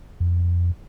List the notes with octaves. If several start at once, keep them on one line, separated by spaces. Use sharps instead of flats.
F2